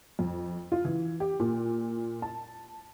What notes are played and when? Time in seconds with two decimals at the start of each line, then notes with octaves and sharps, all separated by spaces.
0.19 F2
0.72 F4
0.85 E3
1.20 G4
1.40 A#2
2.22 A5